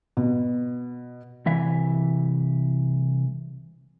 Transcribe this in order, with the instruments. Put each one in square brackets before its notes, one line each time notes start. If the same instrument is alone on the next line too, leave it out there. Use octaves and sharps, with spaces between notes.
[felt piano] B2
[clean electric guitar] C2 E3 E5